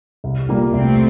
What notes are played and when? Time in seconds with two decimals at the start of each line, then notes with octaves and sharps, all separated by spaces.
0.24 C2
0.49 A#2 G3 A#3
0.73 C2 A3 C4